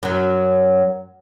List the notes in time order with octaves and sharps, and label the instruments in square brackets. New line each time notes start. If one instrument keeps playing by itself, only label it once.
[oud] F#2 F#3